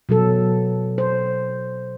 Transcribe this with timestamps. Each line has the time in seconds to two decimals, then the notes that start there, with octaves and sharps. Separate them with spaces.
0.09 B2 F#3 A4
0.98 C5